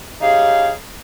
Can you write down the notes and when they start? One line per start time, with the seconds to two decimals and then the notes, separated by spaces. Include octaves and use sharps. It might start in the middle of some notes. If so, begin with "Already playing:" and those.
0.21 C#3 D#4 G4 G#4 F5